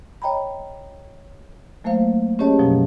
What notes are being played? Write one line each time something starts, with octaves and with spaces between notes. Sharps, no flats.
C#5 D#5 G5 A#5 B5
F#3 A3 A#3 C5 F5
C#4 G4 G#4 C#5 D#5 A5
F#2 B2 F3 F#3